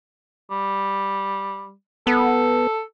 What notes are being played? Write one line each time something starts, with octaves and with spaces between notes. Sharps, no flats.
G3
B3 A4